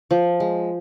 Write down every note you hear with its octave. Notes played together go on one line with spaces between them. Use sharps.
F3
G#3